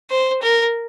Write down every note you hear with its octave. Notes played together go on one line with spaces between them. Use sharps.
C5
A#4